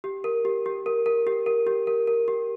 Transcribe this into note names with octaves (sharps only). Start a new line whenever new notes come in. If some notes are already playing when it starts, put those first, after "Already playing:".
G4
A#4
G4
G4
A#4
A#4
G4
A#4
G4
A#4
A#4
G4